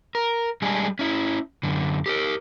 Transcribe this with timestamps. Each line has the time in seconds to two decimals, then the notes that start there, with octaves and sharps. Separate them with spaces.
0.15 A#4
0.62 G3 G#3 D4 G#4
0.99 C#4 E4
1.63 F#2 D3
2.06 G4 A4 A#4